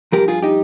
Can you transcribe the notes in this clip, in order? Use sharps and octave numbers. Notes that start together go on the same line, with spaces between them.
G2 F3 G4 A#4
F4 G#4
D#4 G4